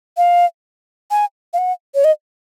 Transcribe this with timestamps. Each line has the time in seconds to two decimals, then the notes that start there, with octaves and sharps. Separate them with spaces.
0.17 F5
1.11 G#5
1.53 F5
1.58 F#5
1.95 C#5
2.04 D#5